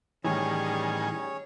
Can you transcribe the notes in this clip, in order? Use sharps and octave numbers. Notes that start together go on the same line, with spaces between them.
A2 D#3 E3 G3 C#4 G#4 C#5 G#5